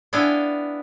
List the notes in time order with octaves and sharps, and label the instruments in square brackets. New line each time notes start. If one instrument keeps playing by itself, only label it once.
[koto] B3 D4 E4 F5 G5 G#5